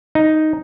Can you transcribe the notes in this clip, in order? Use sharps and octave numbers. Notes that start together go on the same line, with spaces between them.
D#4